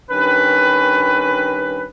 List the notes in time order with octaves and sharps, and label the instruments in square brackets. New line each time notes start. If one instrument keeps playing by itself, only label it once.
[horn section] G2 D#3 C#4 B4